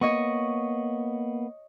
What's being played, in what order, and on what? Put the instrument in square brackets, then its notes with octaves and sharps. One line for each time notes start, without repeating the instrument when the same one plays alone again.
[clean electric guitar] A#3 B3 [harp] C#5 D#5 C#6